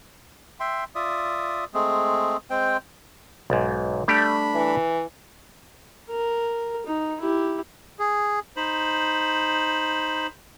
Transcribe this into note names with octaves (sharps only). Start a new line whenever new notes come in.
E5 G5 C6
F4 D5 E5 D#6
G#3 A3 C4 G#4
G#3 C4 C5 G5
B1 G#2
G3 A3 D4 G4 B5
E3
A#4
D#4
E4 G4
G#4
D#4 C5 B5